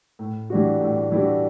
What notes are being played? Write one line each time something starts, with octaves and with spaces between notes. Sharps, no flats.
A2
E3 G3 D4 F#4
A2
E3 G3 D4 F#4